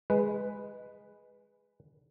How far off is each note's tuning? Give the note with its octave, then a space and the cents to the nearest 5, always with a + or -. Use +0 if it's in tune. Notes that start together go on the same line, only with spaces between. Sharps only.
G#3 -5 B4 +0